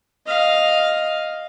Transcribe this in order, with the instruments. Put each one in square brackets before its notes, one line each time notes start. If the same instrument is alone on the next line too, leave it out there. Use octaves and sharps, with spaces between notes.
[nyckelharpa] D#5 F5